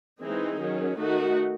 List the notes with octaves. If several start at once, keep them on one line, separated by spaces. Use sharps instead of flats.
E3 G#3 C4 D#4 G#4
D#3 F#3 C#4 G#4
D#3 A3 D#4 F#4